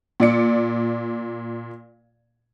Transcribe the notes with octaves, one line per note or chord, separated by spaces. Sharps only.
A#2 D5 C#7